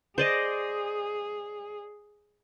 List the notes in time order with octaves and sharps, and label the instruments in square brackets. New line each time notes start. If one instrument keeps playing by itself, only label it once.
[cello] G#4 [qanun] C5 D5 D#5